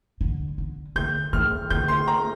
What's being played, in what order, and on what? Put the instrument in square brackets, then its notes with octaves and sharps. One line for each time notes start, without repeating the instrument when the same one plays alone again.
[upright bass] D3
D3
[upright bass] D3 [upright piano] G6
[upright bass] D#3 [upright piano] F6
[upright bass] D3 [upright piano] G6
[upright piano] C6
A#5